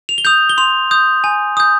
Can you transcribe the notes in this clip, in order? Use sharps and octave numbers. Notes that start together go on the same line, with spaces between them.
F7
G7
D#6 G6 F7
G7
C6 F7
D#6 G6
G#5
D#6 G6